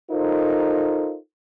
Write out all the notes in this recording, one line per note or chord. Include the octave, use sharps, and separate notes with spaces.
D#4 F4 A4 A#4 C5